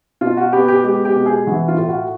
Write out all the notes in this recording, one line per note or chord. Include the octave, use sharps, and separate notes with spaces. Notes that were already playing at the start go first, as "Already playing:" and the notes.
B2 F4
F#4
B3 G4
G4
G#3 G4
G4
B2
G#4
E3 F#4
F4
A2
F#4